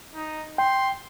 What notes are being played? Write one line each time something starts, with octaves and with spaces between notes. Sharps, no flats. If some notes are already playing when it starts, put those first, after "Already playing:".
D#4
G5 C6